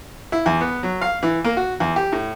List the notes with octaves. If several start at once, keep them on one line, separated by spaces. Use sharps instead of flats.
E4
E2
B3
F#3
F5
E3
A#3
F#4
E2
G4
A2